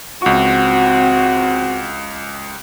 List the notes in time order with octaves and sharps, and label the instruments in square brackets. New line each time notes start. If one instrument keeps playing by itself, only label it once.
[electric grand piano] C#2 C#6 [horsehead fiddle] C4 F#4